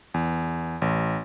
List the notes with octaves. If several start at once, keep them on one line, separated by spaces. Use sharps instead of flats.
E2
A1